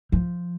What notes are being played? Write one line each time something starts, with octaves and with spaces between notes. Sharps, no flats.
F3